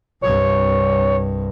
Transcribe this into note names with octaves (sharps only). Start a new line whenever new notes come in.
C2 G2 C#5